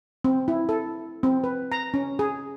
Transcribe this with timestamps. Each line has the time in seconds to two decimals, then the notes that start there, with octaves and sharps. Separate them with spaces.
0.24 C4
0.48 E4
0.69 A4
1.23 C4
1.44 B4
1.72 A#5
1.94 C#4
2.19 G#4